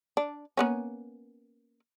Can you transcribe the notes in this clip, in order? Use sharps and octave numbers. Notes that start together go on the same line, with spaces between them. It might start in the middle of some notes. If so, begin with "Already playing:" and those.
D4
A#3 B3 C#4